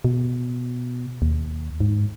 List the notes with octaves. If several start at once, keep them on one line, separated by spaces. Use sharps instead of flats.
B2
D#2
G#2